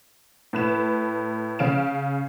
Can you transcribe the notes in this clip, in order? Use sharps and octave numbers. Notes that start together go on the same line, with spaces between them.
A2 B4 E7
C#3 C#4 F5 D7 E7